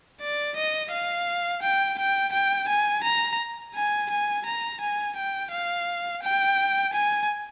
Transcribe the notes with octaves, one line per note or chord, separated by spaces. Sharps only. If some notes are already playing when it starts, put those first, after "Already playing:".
D5
D#5
F5
G5
G5
G5
G#5
A#5
G#5
G#5
A#5
G#5
G5
F5
G5
G#5